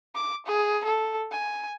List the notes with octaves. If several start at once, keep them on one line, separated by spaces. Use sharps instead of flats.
D6
G#4
A4
G#5